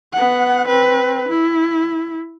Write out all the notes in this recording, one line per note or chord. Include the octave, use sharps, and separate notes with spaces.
B3 F#5
C4 B4
E4